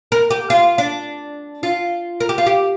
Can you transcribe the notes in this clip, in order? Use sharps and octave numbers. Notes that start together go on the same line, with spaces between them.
A#4
G4
F4
D4
F4
A#4
G4
F4
G4